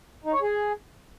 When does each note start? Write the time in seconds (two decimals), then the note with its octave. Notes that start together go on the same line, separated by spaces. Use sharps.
0.24 D#4
0.33 C#5
0.42 G#4